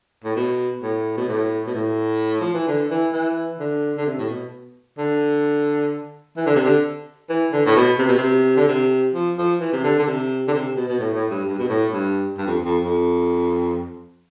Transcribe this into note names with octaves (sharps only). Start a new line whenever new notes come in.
A2
B2
A2
B2
A2
B2
A2
F3
E3
D3
E3
E3
D3
D3
C3
A2
B2
D3
E3
D3
C3
D3
E3
D3
A2
B2
C3
B2
C3
D3
C3
F3
F3
E3
C3
D3
D3
C3
D3
C3
B2
B2
A2
A2
G2
G2
B2
A2
G2
G2
F2
F2
F2